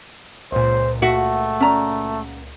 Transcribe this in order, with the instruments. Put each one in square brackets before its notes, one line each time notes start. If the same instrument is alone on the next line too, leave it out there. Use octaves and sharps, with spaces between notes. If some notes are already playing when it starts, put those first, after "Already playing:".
[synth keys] C#2 A#2 [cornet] C5
[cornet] A3 [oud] F#4 [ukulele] E5
[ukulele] C#4 D5 A#5